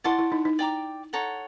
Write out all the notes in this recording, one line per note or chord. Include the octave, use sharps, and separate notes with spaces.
E4 D5 F#5 A5 C6
E4
D#4
D#4
D5 G5 A#5 D6
A4 C#5 F#5 A#5